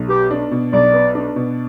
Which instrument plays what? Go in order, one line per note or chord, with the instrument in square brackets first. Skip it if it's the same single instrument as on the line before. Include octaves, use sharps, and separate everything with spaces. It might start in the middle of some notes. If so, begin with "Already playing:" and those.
Already playing: [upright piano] B1
[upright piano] B3 [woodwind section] G4
[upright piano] D4
B2
[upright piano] B1 [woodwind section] D5
[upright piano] B3
D4
B2